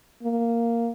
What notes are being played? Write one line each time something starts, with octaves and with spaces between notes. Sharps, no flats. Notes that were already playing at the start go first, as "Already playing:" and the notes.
A#3